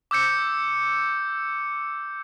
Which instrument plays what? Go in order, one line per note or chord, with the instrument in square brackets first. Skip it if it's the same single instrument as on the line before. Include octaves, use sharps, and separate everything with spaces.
[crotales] D6 E6 G6 C#7